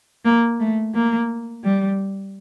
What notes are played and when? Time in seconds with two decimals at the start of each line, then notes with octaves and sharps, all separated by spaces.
0.25 A#3
0.60 A3
0.95 A#3
1.64 G3